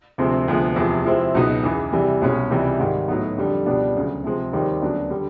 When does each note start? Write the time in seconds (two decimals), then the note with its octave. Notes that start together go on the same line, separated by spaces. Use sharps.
0.18 D2 C3 F3 G#3 C4
0.48 D2 C3 F3 G#3 B3
0.76 E2 C3 F3 G#3
1.05 C3 F3 G#3 C4 E4
1.35 C#2 B2 F#3 B3 D#4
1.64 E2 C#3 E3
1.92 C3 E3 G3
2.22 C2 B2 G#3 C#4
2.50 C#2 C3 E3 G3
2.79 G#2 D#3 G3
3.08 A2 F#3 B3 D#4
3.38 F2 D3 G3
3.66 C#2 B2 G3 B3 D4
3.95 D2 C#3 F#3
4.24 C3 F3 G#3 C4
4.53 D#2 D#3 G3 C4 D#4
4.82 D2 C#3 F#3 B3 D4
5.11 D3 G3